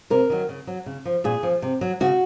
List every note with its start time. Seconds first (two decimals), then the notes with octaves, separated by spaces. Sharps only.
0.10 C3 A#4
0.30 D#3 F#3
0.49 C#3
0.67 F#3
0.86 C#3
1.05 F3
1.24 A#2 G#4
1.43 F3
1.62 C3
1.81 F#3
2.00 C#3 F#4